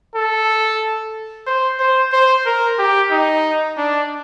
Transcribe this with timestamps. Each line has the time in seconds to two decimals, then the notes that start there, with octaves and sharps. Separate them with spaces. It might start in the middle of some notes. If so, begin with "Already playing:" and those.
0.15 A4
1.47 C5
1.79 C5
2.13 C5
2.46 A#4
2.79 G4
3.11 D#4
3.77 D4